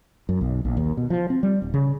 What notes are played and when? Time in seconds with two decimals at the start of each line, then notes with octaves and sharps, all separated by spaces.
0.29 F#2
0.41 B1
0.65 A#1
0.77 D#2
0.97 B2
1.10 F3
1.30 C4
1.43 G3
1.62 D1
1.74 C#3